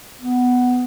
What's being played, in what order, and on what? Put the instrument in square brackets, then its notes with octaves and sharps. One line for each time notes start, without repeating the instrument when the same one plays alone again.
[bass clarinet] B3